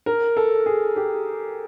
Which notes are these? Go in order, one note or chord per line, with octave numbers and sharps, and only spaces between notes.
A#4
A4
G#4
G4